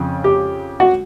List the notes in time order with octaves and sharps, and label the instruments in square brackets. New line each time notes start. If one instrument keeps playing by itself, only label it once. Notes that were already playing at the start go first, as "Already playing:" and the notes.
Already playing: [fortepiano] F2 C#3
G4
F#4